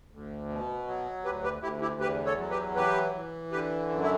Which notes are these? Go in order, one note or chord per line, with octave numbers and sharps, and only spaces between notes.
D2
B2
F#3
D2 G4 B4
G4 B4
D2 E4 G4
E4 G4
E2 G4 B4
A4 C#5
F#3
G4 B4
E3 G4 B4
E3
D3 G4 B4
F#2
E4